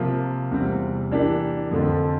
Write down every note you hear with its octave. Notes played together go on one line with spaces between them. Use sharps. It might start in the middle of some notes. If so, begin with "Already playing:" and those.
Already playing: C3 F3 A#3 F4
E2 C3 G3 C4
E3 A#3 D4 G4
F2 D3 F3